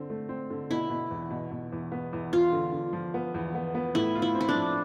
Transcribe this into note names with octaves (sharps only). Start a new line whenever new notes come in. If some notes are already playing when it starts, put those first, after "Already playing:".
Already playing: D3 C4
A3
C4
D3
B2 E4
B2
E2
B2
B2
E2
B3
E2
E2 F4
D3
D3
F3
B3
E2
B3
B3
A2 E4
F4
E4
C4
E4
D4
F3